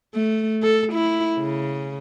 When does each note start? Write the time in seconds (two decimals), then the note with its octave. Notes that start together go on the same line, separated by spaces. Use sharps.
0.15 A3
0.63 A4
0.93 E4
1.38 C#3